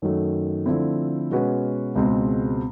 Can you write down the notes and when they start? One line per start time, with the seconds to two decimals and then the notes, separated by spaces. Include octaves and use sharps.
0.02 F#2 D#3 F#3 A3
0.66 D3 F3 A3 C4 E4
1.31 B2 G#3 C#4 F#4 B4
1.96 C#2 B2 G#3 C4